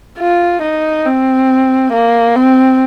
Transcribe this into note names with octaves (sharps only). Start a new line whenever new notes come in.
F4
D#4
C4
A#3
C4